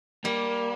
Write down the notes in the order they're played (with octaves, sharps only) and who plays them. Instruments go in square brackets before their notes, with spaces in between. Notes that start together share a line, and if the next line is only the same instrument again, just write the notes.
[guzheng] G3 [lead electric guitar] A#3